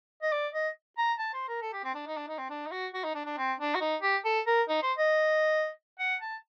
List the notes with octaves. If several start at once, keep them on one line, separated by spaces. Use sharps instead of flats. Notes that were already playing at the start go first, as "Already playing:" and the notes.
D#5
D5
D#5
A#5
A5
C5
A#4
A4
G4
C4
D4
D#4
D4
D#4
C4
D4
D#4
F#4
F#4
D#4
D4
D4
C4
D4
F#4
D#4
G4
A4
A#4
D#4
C5
D#5
F#5
A5